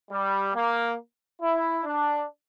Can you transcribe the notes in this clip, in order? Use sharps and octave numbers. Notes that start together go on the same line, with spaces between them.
G3
A#3
E4
D4